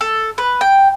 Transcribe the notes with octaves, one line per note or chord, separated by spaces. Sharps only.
A4
B4
G5